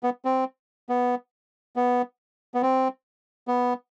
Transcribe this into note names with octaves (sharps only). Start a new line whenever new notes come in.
B3
C4
B3
B3
B3
C4
B3